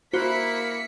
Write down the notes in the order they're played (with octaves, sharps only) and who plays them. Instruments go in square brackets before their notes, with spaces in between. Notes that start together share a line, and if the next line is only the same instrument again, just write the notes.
[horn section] A#3 [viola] E4 B5 [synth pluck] F#4 C5 [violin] B6 C#7